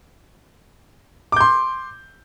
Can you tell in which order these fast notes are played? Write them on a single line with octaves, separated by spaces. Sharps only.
D6 G6 C6